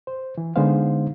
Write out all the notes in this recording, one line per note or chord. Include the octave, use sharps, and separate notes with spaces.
C5
E3
D3 G#3 B3 D#4 C5 F5